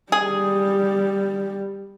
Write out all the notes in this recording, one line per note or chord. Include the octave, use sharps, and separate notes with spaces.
G3 G#4